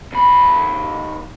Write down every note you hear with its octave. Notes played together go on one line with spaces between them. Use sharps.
D#2 B5